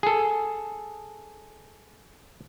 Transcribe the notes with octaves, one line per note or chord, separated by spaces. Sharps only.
G#4 A4